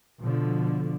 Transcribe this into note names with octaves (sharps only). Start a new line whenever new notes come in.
B2 D3 F3